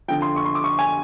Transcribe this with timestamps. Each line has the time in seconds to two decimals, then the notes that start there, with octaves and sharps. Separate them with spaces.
0.08 F2 D3 F3 G5
0.22 C6
0.36 C#6
0.45 C6
0.55 D6
0.64 C#6
0.79 G#5